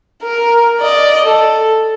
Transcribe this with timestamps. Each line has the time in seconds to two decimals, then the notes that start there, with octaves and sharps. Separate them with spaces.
0.24 A#4
0.80 D5 D#5
1.25 A4